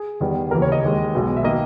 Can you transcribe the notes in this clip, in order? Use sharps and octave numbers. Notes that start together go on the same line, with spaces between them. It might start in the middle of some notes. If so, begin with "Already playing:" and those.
Already playing: G#4
E2 D#3 G3 B3
D#2 C#3 E3 A#4
C#5
D#5
D#2 D#3 G#3
B1 B2 G#3 B3
E5
D#3 A#3 D#5